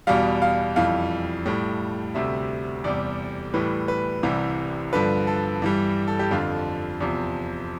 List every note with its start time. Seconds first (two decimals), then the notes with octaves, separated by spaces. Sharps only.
0.07 E2 B2 G3 F5
0.42 F5
0.76 F2 E3 G3 F5
1.46 A2 G3
2.14 D2 C3 G3 E5
2.84 E2 C3 G3 D5
3.54 A2 E3 G3 B4
3.88 B4
4.23 C2 C3 E3 G3
4.93 G2 D3 F3 B4
5.27 A4
5.62 G2 E3 G3
6.08 A4
6.19 G4
6.31 F2 D3 F3 F4
7.01 E2 C3 F3